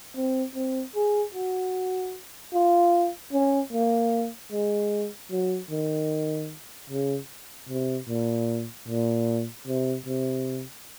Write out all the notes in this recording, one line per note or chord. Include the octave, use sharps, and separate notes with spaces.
C4
C4
G#4
F#4
F4
C#4
A#3
G#3
F#3
D#3
C#3
C3
A#2
A#2
C3
C3